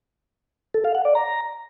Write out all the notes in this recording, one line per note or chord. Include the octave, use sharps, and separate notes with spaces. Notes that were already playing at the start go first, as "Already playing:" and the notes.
A4
F5
F#5
D5
A#5